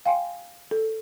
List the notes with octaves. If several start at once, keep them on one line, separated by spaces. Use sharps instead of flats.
F5 G5 G#5 C6
A4